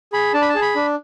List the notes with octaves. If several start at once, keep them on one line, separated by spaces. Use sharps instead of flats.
G#4 B5
D4 A5
B5
A5
G#4
B5
D4